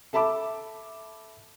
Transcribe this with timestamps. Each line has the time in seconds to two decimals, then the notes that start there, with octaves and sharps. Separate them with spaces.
0.13 A4 E5 A5 B5 D6